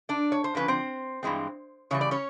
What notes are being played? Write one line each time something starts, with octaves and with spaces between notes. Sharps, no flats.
D4 D5
C#5
C5
D3 F3 A#3 C#4 B4
C4 C5
G2 E3 G#3 C4
C#3 E3 G3 C#5
D5
C#4 C#5